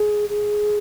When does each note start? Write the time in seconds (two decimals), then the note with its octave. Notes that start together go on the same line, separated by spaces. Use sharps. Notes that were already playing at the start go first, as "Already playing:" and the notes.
Already playing: G#4
0.29 G#4